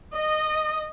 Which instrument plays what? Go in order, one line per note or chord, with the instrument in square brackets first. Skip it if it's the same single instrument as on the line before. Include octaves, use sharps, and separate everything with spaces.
[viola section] D#5